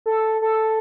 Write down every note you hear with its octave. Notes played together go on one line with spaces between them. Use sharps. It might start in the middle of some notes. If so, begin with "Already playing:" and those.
A4
A4